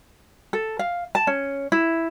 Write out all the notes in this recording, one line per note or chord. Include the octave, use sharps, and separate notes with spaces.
A4
F5
A5
C#4
E4